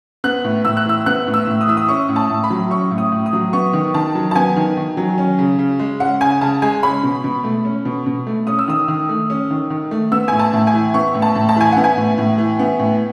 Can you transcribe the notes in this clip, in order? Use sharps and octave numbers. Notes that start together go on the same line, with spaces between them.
B3 F#6
A2
A2 E6
F#6
E3 E6
B3 F#6
A2
E6
A2
D#6
E3 E6
D#6
C#4 C#6
A2
A5
A2
B5
F#3
C#4 C#6
A2
D#6
A2
D#6
F#3
B3 C#6
D#3
D#3 A5
F#3
A5
B3 G#5
D#3
D#3
F#3
C#4
C#3
C#3
G#3
C#4 F#5
C#3 G#5
C#3 A5
G#3 G#5
C#4 B5
B2
B2
A3
C#4
B2
B2
A3
C#4 D#6
E6
D#3 D#6
D#3
A3
C#4
D#3
D#3
A3
B3 E6
A2 G#5
A5
A2
G#5
E3
B3 C#6
A2
A5
A2
A5
E3 G#5
B3 F#5
G#5
A2
A2
E3
B3
A2